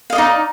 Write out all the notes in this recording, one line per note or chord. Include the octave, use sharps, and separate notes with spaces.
D#4 D5 D#5 F5